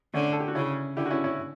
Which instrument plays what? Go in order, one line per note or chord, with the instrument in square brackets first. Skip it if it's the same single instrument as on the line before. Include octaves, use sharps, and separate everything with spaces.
[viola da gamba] D3 [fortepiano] A3 C#4
[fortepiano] A4
G4
F#4
[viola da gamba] C#3 [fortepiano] C#4 E4
[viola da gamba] D3 [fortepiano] E4 G4
[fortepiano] F#4
C#4 E4
C#4 E4